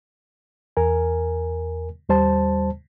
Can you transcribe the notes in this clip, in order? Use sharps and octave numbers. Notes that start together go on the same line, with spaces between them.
E2 A#4 G#5
D#2 G3 C5 A5